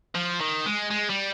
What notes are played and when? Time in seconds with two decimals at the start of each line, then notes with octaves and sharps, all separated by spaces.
0.15 F3
0.41 D#3
0.66 G#3
0.91 G#3
1.10 G3